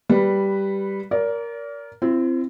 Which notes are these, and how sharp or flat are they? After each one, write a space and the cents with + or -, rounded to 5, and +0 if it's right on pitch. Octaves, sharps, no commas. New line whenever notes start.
G3 +0 B4 +0
A#4 +5 D5 -35
C4 +0 E4 +40